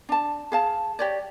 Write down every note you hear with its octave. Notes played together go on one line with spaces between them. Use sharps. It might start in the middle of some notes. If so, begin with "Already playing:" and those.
D4 A5
G#4 F5 A5
G4 C#5 D5